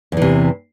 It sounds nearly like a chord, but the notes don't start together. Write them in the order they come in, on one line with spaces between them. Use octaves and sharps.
E2 E3 C3